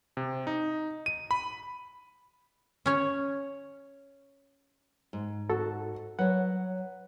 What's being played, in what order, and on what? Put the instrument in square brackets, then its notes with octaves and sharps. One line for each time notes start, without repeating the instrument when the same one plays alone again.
[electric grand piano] C3
D#4
D#7
B5
[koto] C#4 C#5
[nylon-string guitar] G#2
[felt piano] F#4 [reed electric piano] A4
[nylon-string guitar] F#3 C#5 [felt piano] B4 [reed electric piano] F#5